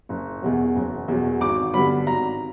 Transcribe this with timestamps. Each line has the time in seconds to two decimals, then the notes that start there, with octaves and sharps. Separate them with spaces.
0.09 F#1
0.42 E2 B2 F#3
0.75 F#1
1.08 E2 B2 F#3
1.41 G#1 D6
1.74 G2 D3 F#3 B3 B5
2.06 G#1 A#5